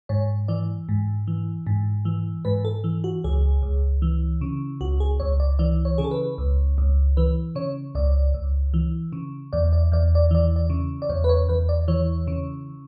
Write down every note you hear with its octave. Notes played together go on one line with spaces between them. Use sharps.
G#2 C#5
E3 D5
G#2
E3
G#2
E3
G#2 B4
A4
E3
F#4
C#2 G#4
C#2
E3
C#3
C#2 F#4
G#4
C#2 C#5
D5
E3 D5
C#5
C#3 G#4
A4
B4
C#2
C#2
E3 B4
C#3 C#5
C#2 D5
C#2
E3
C#3
E2 D5
D5
E2 D5
D5
E3 D5
D5
C#3
D5
E2 C#5
B4
C#5
E2 B4
D5
E3 C#5
C#3